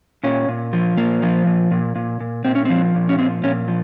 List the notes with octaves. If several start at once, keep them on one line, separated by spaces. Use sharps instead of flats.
A#2 C#4
A#2
F3
A#2 A#3
F3
A#2
A#2
A#2
A#2
A#2 C4
C#4
F3 C4
A#2
C#4
F3 C4
A#2 C#4
F3